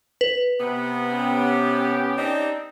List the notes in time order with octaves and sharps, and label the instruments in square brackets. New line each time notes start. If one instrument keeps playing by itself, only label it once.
[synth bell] B4
[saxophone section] C3 B3
[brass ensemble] C#4 G4
[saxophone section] C4 D4 D#4